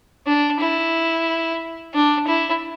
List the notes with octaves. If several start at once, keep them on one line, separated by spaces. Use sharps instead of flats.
D4
E4
D4
E4